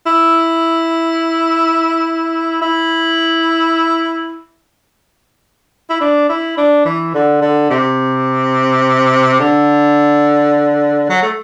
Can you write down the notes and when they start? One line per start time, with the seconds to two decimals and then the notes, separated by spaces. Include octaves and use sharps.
0.06 E4
2.62 E4
5.90 E4
6.01 D4
6.29 E4
6.57 D4
6.85 E3
7.14 D3
7.42 D3
7.70 C3
9.40 D3
11.10 F#3
11.23 A3